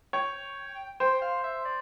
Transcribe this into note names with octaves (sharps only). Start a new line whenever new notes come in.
C#5 G5
C5 G5
F5
E5
D5